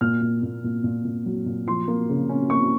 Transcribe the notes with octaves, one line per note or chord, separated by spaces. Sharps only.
A#2 F6
A#2
A#2
A#2
A#2
A#2
F#3
A#2
F3 C6
A#3
C#3
C#4
A#3 C#6